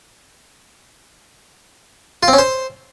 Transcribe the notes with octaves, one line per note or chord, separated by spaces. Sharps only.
F4
C4
C#4
C5